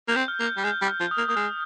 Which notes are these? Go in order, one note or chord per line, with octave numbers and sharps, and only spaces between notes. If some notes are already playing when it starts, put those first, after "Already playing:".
A#3 G6
C4
F6
A#3
F6
G3
G#3 G6
G3
F6
F3
D#6
A#3
A#3 D#6
G#3 F6